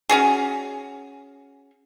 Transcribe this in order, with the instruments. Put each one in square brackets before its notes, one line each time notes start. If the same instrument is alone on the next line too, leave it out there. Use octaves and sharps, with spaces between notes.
[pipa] C#4 F#4 G#4